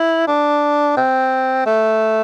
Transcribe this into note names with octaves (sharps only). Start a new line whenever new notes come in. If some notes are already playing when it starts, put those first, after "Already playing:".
Already playing: E4
D4
C4
A3